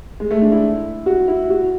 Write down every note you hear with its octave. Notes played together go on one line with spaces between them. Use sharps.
G#3
A3
D4
E4
F#4
E4
F#4